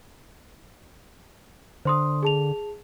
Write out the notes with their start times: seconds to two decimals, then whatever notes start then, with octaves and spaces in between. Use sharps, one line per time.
1.85 D3 C5 C6 D#6
2.23 G#4 A5 F7